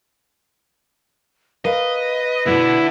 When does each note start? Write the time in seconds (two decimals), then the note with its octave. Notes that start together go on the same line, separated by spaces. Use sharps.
1.65 A#4 B4 D#5 F5
2.46 B2 D3 A3 B3 E4